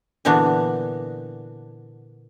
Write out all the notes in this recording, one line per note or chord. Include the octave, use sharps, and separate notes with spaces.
A#2 D3 E3 B3 D4 F#4